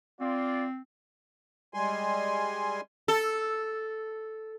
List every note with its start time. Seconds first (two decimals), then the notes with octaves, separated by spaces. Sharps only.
0.21 C4 F4 D5
1.74 G3 G#3 G#5 C6
3.08 A4